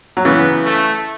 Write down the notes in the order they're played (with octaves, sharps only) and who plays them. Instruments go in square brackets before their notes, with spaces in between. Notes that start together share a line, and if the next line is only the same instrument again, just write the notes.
[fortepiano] F#3
[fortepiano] C#3 E3 [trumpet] B3
[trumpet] A3